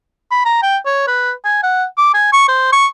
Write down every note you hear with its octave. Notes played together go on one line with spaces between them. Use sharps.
B5
A#5
G5
C#5
B4
G#5
F#5
D6
G#5
C#6
C5
C#6